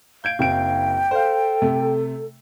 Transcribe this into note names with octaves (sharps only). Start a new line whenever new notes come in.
F5 G6 G#6 D7
F#1 C4 G5 D7
A4 C5 F5
C3 A3